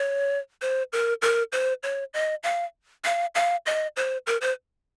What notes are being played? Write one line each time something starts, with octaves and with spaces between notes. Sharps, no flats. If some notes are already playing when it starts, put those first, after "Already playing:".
Already playing: C#5
C5
A#4
A#4
C5
C#5
D#5
F5
F5
F5
D#5
C5
A#4
C5